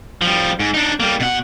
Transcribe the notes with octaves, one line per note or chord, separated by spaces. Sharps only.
F3 G3
G#2
D4 D#4
G3 A#3
B2 F#5